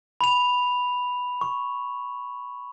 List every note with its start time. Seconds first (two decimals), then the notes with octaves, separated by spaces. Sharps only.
0.21 B5 F7
1.41 C#6